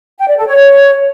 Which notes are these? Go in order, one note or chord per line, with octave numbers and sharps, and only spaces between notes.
G5
D5
A4
C#5